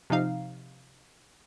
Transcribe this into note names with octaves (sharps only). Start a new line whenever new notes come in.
C3 F3 D#4 F5